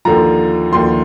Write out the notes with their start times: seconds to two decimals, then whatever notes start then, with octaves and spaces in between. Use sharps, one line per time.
0.05 D#2 D3 F3 A#5
0.72 D#2 D3 F3 C6